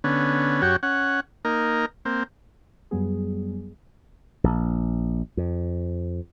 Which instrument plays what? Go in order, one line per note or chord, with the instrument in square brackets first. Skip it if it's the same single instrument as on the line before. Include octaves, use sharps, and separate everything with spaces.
[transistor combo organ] D3 B3 C#4
F#2 F#4 G4 C#5
C#4 F#5
A#3 D#4 A#4
A#3 C4
[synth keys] F#2 F#3 G3 B3 G#4
[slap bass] A#1
F2